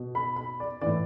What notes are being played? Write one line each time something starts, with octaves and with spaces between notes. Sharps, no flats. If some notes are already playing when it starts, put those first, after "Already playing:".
Already playing: B2
B5
B5
D5
A2 E3 D5